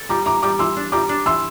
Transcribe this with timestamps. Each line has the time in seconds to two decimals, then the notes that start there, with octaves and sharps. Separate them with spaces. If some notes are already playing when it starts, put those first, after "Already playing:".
Already playing: A4
0.09 G3 A#5 D6
0.26 E3 A#5 D6
0.42 G3 A#5 D6
0.59 E3 C6 E6
0.76 D4
0.92 G3 A#5 D6
1.09 D4
1.26 E3 C6 E6